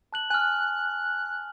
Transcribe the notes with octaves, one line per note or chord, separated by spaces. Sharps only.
A5 F#6 F#7
G#5 F6 F#6